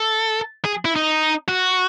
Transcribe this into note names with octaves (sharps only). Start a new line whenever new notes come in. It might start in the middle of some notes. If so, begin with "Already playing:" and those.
Already playing: A4
G#4
E4
D#4
F#4